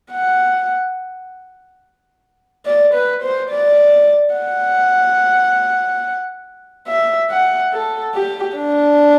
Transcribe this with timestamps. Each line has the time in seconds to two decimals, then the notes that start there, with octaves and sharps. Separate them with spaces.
0.12 F#5
2.66 D5
2.94 B4
3.23 C5
3.50 D5
4.35 F#5
6.88 E5
7.30 F#5
7.72 A4
8.15 G4
8.57 D4